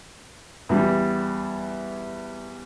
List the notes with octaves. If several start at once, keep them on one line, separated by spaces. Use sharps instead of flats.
E2 G3